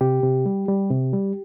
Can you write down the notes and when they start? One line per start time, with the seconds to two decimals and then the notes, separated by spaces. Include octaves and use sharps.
0.01 C3 G4
0.23 C3
0.46 G3
0.68 G3
0.91 C3
1.13 G3